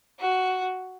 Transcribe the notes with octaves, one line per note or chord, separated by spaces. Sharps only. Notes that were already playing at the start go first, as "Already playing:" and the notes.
F#4